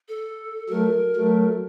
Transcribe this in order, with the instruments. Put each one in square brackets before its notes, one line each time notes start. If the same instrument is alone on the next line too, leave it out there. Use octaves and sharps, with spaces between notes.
[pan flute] A4
[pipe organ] F#3 A3 [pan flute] A#4
[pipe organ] F#3 A3